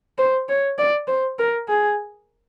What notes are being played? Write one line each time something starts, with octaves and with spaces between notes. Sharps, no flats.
C5
C#5
D5
C5
A#4
G#4